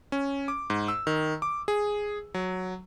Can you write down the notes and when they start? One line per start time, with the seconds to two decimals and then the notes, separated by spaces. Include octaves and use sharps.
0.12 C#4
0.48 D6
0.70 G#2
0.88 E6
1.07 D#3
1.42 D6
1.68 G#4
2.34 F#3